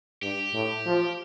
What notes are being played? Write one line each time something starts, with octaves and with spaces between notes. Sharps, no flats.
G2 G4
A2
F3